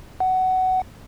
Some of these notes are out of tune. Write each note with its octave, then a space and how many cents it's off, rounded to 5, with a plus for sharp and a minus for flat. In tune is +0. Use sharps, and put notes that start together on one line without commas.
F#5 +15